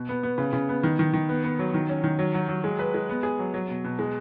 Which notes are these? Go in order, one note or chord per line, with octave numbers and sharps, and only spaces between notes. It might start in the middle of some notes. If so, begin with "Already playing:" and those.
Already playing: B2
B3
B3
C#3
C#3
B3
D#3
D#3
D#3
B3
B3
F#3
D#3
C#4
D#3
F#3
F#3
F#3
G#3
B4
G#3
B3
G#4
F#3
F#3
B2
B2
G#3